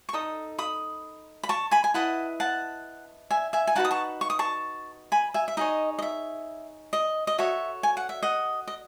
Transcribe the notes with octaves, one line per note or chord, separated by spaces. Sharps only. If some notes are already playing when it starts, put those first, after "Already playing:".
C#6
D#4 A4 D#6
B5 D#6
B5
A5 C#6
G#5 B5
G#5
E4 B4 D#5 F#5 A5
F#5 A5
E5 G#5
E5 G#5
G#5
D#4 F#4 B4 F#5 A5
D#6
A5 C#6
C#6
D#6
A5 C#6
G#5 B5
E5 G#5
E5
D#4 G#4 C#5 D#5
D#5
E5
D#5
D#5
F#4 A4 C#5 E5
G#5
F#5
E5
D#5 F#5
D#5